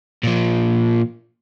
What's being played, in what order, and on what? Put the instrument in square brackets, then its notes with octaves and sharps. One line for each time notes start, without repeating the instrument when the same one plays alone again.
[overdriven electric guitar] A#2 F3